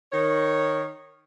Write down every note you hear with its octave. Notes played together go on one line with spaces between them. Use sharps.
D#3 C#5